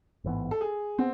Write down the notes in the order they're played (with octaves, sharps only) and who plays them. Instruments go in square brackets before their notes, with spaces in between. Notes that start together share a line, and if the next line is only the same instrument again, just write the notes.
[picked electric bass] A1 G#2 E3 B3
[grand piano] A4
G#4
[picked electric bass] B3 [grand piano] C4